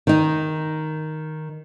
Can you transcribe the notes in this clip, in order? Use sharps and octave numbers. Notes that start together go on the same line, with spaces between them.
D#3 D#4